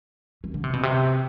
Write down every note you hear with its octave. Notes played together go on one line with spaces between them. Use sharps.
E3
D3
C3
B2
C3